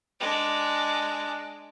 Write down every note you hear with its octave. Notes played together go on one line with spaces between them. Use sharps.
G#3 D4